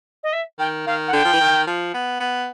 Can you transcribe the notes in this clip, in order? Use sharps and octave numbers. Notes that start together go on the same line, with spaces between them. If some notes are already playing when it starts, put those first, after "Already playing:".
D#5
E5
D#3 G5
D#3 F5
F#5
D3 G5
F3
E3
D#3
F3
B3
B3